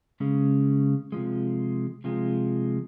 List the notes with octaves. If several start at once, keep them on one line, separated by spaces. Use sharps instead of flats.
C#3 G#3 C#4 G#4
C3 F3 G#3
C3 F3 G#3